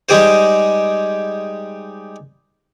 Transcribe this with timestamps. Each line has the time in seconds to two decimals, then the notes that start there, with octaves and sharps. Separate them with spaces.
0.09 G3 G#3 D#4 G4 G#4 C5